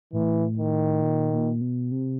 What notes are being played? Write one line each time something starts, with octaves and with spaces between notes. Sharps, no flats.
A2 E3
D#3
A#2
A#2
B2
C3